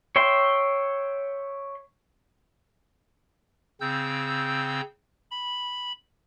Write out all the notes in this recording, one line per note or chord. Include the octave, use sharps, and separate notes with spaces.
C#5 E5 G5 C6
C#3 C4 E6 G6
B5